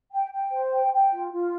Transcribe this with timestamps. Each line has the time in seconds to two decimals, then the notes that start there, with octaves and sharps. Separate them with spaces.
0.12 G5
0.32 G5
0.52 C5
0.72 G5
0.93 G5
1.12 F4
1.32 F4